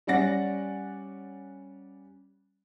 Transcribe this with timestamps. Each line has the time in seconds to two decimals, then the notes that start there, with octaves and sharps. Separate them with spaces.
0.07 G3 C#4 D5 F#5 A6 A#6